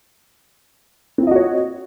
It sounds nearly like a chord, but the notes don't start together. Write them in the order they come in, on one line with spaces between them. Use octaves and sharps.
C4 F4 D#5 F#4 C#5